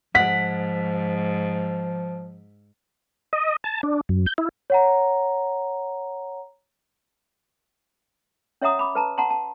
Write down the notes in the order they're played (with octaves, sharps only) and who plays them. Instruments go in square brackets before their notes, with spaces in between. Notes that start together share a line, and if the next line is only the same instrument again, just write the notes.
[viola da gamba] G#2 [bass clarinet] F3 [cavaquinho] F#5 [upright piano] B6
[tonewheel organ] D#5
A5
D4
F#2
G6
E4
[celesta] C#5 F#5 A#5
[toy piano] C#4 C#5 E5 F#5 A#5 D#6
B5 D6
B4 A5 A#5
F#5 A5 A#5 C6
A5